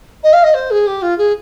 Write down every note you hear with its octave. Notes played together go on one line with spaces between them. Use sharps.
D#5
F5
D#5
C5
G#4
G4
F4
G#4